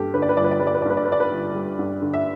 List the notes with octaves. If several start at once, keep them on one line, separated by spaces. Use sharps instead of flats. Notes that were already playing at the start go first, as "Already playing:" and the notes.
Already playing: G2 G3 G4 A4
D3 B4
D5
B4
G1 D5
B4
D5
G3 B4
D5
B4
D5
G2 B4
D5
B4
D3 D5
B4
G1
G3
G2
D3
E5